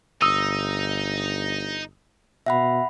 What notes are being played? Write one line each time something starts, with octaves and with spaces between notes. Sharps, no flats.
G1 D#4 D#6 E6 D#7
B2 E5 F#5 B5